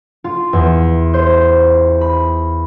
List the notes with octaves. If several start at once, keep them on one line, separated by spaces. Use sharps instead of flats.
F4
E2
C5
B5